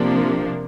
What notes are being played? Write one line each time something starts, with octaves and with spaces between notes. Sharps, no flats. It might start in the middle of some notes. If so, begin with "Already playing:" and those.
Already playing: C3 F3 A#3 D4